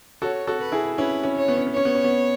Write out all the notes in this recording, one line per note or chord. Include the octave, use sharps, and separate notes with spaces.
F#4 A4 C#5
F#4 A4
B4
E4 G#4
C#4 E4 B4
C#4
C#5
B3
C#4
B3
C#4 C#5
B3
C#4
B3